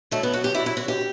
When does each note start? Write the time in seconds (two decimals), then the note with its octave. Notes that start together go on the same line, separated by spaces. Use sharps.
0.11 F#2 D3 F#3 A3
0.23 B3
0.33 F#4
0.44 G4
0.55 F#2 D3 F#3 E4
0.66 E4
0.77 F#4
0.88 G4